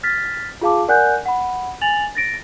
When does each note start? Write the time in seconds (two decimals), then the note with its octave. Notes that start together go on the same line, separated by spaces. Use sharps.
0.03 F6 A6 B6
0.62 F4 G#4 F5 A5 D6
0.88 A#4 D5 F#5 G#5 F#6 G6
1.26 F#5 B5
1.81 G#5 A6 F7 F#7
2.15 A6 A#6 D7